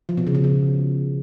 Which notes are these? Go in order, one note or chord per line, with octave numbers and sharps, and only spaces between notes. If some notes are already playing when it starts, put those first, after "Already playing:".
F3
B2
C#3
B2
C#3